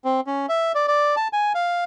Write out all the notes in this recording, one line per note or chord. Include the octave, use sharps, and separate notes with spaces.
C4
C#4
E5
D5
D5
A5
G#5
F5